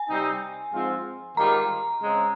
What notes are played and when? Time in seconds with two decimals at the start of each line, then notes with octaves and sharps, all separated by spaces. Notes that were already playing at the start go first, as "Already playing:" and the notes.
Already playing: G#5
0.09 C3 G3 C4 D#4
0.73 G#2 F3 C4 F4
1.36 G#2 D#3 G3 A#3 F4 A#5
2.01 C#3 G#3 C4